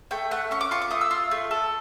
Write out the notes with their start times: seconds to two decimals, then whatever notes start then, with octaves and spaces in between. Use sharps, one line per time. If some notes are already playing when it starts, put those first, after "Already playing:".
0.11 A3 G5
0.31 A3 F#5
0.51 C#4 C#6
0.61 D6
0.71 F4 C#6
0.82 D6
0.91 A3 D#6
1.01 E6
1.11 F4
1.31 A3
1.51 A4